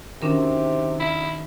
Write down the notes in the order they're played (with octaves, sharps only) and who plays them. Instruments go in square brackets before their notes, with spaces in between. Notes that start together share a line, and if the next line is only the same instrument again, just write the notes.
[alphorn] C3 [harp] D#3 F#4 [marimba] C#4 D4 A#4
[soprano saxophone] E4